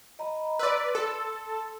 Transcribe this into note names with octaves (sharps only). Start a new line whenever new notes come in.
D#5 A#5 B5
B4 D5 C6 E6
A4